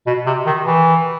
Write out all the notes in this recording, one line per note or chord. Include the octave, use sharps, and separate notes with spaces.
B2
C3
D#3
E3